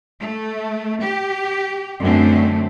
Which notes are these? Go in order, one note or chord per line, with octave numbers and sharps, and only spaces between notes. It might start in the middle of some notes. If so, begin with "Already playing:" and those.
A3
G4
F#2 D3 A3 C4